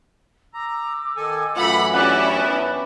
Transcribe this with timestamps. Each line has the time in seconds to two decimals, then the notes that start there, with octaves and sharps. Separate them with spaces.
0.54 A#5 D6 E6
1.17 D#3 A4 G#5
1.56 F#2 E3 A3 F4 F#5 B5
1.94 C#4 D4 E4 G4 D5 F#5
2.34 B3 B4